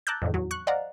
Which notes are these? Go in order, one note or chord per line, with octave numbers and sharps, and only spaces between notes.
A5 A#5 D6 E6 F#6 G6
F2 A2 D3 D#3
E2 F#3
C#6 F#6
C5 D5 D#5 F5 F#5 A#5